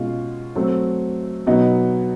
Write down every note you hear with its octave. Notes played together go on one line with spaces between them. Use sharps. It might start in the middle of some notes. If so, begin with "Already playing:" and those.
Already playing: B2 G#3 C#4 F4
F#3 A3 C4
B2 F#3 B3 D#4